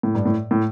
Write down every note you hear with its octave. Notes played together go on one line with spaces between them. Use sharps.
A2
G2
A2
A2